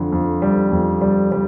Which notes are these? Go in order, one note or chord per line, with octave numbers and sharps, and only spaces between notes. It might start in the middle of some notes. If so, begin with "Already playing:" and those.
Already playing: F2 D3
F2
G3
F2
G3
G3